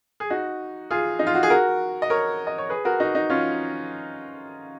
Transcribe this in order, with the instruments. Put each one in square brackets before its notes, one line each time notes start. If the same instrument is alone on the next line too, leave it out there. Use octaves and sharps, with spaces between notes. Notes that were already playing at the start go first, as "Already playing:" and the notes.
[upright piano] G#4
D#4 F#4
F4 G#4
D#4
F4
F#4
G#4
F#4 A#4
D#5
A#4 C#5
D#5
C#5
G#4 B4
F#4 A#4
D#4 F#4
D#4
C#4 F4